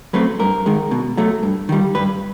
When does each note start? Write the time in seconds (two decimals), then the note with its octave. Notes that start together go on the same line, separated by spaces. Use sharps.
0.13 F#3 A3 C4 B4
0.40 G2 A#4
0.66 D#3 G#3
0.91 B2
1.17 F#3 A3
1.43 G2
1.69 D#3 G3
1.95 G2 B4